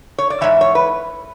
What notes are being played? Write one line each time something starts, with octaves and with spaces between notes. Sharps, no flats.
C#5
D5
G#2 E3 C#5 E5
C#5
B4